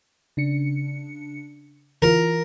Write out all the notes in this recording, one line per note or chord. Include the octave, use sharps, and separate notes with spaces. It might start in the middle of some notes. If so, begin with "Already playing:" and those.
C#3 D4 C#7
E3 F4 A#4